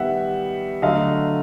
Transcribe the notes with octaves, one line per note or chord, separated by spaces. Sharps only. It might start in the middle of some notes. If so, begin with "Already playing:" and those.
Already playing: D#3 G3 B3 E5 F#5
D3 F#3 A3 D#5 F5